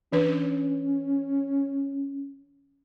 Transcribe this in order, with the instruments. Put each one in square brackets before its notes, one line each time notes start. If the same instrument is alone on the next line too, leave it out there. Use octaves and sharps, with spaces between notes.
[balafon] E3 D4 B4 [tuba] C#4